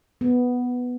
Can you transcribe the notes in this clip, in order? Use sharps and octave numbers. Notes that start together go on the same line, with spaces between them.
B3